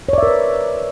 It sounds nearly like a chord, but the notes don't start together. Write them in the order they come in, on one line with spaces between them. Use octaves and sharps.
C#5 D5 E5 A#4 B4